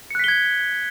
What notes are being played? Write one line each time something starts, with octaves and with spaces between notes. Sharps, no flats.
F#6 G#6 B6 C#7 G7